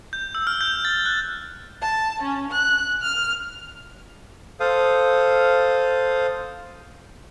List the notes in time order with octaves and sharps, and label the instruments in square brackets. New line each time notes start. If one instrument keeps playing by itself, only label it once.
[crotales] G6
E6
F6
G6
A6
F#6
[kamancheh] A5
C#4
F#6
F6
[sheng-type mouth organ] A4 C5 F5 D#6